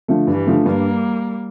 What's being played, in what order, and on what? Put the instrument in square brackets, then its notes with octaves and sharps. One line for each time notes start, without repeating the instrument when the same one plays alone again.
[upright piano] D3 F3 A3
[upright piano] G2 [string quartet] E3 G3
[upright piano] D3 F3 A3
[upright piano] G2 [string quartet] G3 A#3